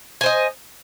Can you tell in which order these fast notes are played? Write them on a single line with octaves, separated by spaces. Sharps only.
G#5 C5 D#5